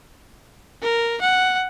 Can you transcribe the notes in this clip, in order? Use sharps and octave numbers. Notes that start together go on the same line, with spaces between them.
A#4
F#5